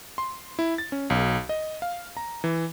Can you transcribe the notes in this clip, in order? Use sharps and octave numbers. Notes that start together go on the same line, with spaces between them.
C6
E4
A6
C#4
B1
D#5
F5
A#5
E3